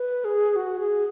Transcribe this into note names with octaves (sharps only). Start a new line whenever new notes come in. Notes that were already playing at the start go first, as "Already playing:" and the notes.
Already playing: B4
G#4
F#4
G#4